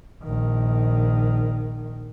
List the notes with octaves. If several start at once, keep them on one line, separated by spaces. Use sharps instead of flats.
A#1 D#3